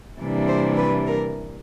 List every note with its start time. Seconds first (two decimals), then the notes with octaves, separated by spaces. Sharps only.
0.20 C3 E3 G3 A#3 D4
0.48 C5
0.77 B4
1.07 A#4